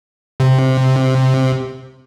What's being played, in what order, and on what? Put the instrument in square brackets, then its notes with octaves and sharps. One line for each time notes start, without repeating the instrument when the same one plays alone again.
[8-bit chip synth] C3